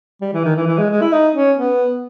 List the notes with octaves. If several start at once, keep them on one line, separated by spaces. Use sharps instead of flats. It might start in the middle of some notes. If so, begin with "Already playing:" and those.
G3
E3
D#3
E3
E3
G#3
G#3
E4
D#4
C#4
B3